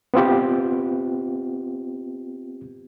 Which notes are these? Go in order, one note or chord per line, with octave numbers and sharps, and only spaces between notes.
B3 C4 F4 G4